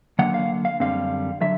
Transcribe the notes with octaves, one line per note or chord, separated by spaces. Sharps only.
D3 F#3 A#3 F#5
F5
F5
F#2 D3 G3 C4 F5
D3 F#3 E5